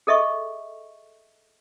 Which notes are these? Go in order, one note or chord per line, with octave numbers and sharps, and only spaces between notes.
G#4 A4 D#5 E5 C#6